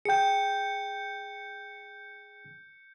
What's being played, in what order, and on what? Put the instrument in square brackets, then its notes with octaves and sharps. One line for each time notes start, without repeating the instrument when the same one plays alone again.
[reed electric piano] G#4 G5 [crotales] G6 C#7